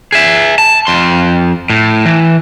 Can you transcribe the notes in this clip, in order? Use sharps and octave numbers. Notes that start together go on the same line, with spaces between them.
G#4 E5
A5
F2 C6
A2
E3